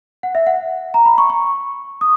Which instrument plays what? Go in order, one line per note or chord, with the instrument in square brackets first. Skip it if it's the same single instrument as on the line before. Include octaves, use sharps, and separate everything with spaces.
[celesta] F#5
E5
F#5
A#5
B5
C#6
C#6
D#6